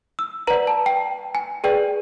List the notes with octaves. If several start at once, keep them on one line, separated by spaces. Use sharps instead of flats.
E6
B4 D5 F#5 A#5
A5
G5
G#5
G#4 B4 D5 G5